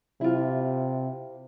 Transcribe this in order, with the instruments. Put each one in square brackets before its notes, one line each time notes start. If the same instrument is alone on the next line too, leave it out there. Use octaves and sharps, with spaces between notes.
[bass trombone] C3 [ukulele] E4 F4